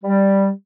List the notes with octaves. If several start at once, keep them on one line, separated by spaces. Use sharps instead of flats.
G3